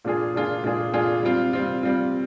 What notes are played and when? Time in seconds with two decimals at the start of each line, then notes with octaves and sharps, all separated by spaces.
0.05 A#2 G#3 D4 F4 G#4
0.34 A#2 G#3 D4 F4 G#4
0.64 A#2 G#3 D4 F4 G#4
0.93 A#2 G#3 D4 F4 G#4
1.23 G3 C4 F4
1.53 G3 C4 F4
1.83 G3 C4 F4